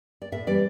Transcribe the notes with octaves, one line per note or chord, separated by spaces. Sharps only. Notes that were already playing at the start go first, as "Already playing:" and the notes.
D5
A2 E5
E3 G3 C4 D5